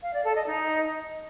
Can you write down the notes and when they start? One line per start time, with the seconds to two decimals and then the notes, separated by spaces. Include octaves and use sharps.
0.02 F5
0.13 D5
0.24 A4
0.35 D#5
0.46 D#4